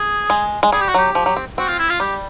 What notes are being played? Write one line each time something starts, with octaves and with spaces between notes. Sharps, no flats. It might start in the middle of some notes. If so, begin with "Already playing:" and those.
Already playing: G#4
G#3
G#3
G3 G#4
G4
F#4
F#3 G4
F3
F#3
C4
C4 F#4
F4
E4
F4
G3 G4